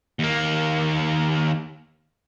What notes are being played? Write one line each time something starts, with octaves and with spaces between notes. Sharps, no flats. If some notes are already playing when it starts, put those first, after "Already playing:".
D#2 A#3